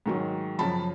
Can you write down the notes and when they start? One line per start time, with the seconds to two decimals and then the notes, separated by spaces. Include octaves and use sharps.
0.06 G#2 D#3 F#3
0.59 F#2 C#3 F3 A5 B5